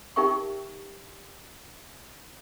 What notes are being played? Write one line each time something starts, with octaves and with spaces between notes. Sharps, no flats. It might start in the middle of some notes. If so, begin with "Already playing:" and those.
D#4 G4 A#4 E5 G5 C#6